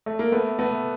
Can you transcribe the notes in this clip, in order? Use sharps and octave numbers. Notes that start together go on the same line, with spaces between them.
A3
A#3
A3 B3
A3 B3